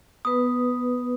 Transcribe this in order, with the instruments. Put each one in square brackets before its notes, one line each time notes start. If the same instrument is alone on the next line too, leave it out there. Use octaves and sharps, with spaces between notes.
[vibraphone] B3 B4 [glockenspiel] D#6